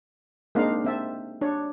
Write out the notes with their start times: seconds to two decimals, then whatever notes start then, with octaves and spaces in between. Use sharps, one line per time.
0.55 G#3 A#3 C4 D4 D#4 F5
0.85 C4 E5 A5
1.41 D4 C#5